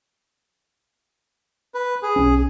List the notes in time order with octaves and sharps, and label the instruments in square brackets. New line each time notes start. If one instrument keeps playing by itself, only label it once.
[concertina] B4
G#4
[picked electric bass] B1 C#4